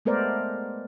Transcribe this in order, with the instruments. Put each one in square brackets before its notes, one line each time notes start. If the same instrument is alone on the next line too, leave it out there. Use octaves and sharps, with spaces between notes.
[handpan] G#3 A3 B3 A#4 C5 D5